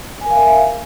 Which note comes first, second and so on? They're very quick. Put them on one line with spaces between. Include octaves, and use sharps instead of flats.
G#5 A#4 F5 E5